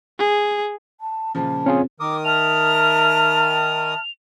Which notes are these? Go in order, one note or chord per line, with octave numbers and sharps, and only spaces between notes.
G#4
A5
A#2 C#3 F3 A5
C4 C#4 F4 G#4
D#3 A#4 D6 D#6
E5 A5 F6 F7